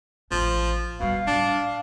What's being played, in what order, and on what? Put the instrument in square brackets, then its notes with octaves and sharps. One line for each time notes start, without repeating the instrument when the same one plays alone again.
[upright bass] A1 A2 [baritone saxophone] F3
[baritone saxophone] B2 [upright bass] F#3 G3 [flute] F5
[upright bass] A2 [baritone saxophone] D4